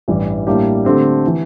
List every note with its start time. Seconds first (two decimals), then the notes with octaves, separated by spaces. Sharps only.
0.08 A1 G2 E3 G3
0.47 A2 G3 A#3 D4 G4
0.85 D3 A3 C4 G4
1.27 E3